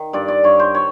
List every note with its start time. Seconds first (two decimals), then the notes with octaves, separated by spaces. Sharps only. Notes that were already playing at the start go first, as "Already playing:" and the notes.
Already playing: D#3
0.13 G2 D5
0.28 D5
0.44 G2 C#5
0.59 C5
0.75 C#5